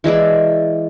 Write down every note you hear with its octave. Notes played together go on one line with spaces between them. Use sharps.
E3 G#3 E4 D5